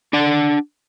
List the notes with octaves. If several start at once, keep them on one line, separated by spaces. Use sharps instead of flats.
D4 D5 F#5 A5